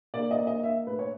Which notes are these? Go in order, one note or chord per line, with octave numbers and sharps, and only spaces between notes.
A#3 D5
D#5
A#3
D#5
A#3 E5
A2 B4
C#5